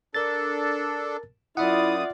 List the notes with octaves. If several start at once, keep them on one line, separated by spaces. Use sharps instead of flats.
D4 A4 A#4 A6
F#2 E4 F4 D5 E5 F#5 D#6